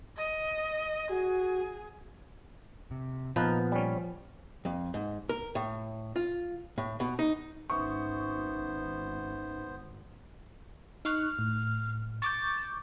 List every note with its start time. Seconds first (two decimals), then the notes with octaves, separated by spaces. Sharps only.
0.16 D#5
1.10 F#4 G#4
2.91 C3
3.36 A#2 F3 B3 D#4 A#4 B4
3.72 G3 C#4
4.65 F2
4.94 G#2
5.29 A#4
5.55 A2
6.16 F4
6.78 A2
7.00 B2
7.19 D#4
7.70 G#1 B3 C#4 D#4 C5 E5 C#6
11.05 D#4 C#6 F6 F#6
11.39 A2
12.22 C#6 D6 G6 A6